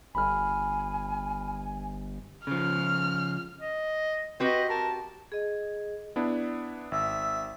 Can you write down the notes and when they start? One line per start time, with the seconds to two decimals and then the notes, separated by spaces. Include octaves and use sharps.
0.15 G1 G#5 B5 F6
2.47 C#3 F3 F6
3.61 D#5
4.40 C4 F#4 G4 B4 D#5
4.69 A#4 A5
5.32 G#4 D#5
6.16 B3 D4 E4
6.92 G#1 E5